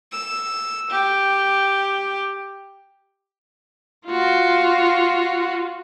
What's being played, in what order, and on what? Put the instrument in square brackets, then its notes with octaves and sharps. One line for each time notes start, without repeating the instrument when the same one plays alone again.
[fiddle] E6
G4
[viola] F4 F#4